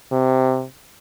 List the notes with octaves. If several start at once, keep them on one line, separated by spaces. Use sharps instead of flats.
C3